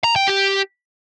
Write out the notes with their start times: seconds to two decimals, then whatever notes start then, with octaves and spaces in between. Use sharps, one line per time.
0.04 A#5
0.16 G5
0.28 G4